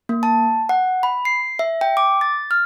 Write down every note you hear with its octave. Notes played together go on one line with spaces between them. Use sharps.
A#3
A5
F#5
B5
C7
E5
G5
D6
A6
F6